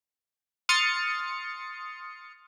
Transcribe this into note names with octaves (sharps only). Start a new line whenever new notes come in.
C6 D#6 F6 A6 C#7